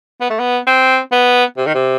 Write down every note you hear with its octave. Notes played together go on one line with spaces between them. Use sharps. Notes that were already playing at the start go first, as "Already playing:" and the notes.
B3
A3
B3
C4
B3
C3
D#3
C3